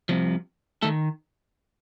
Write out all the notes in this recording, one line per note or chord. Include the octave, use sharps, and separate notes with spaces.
C2 C3 F3
D#3 A3 A4